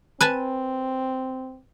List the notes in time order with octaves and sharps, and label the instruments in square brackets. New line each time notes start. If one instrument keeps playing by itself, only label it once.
[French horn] C4 [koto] B4 G#5 A5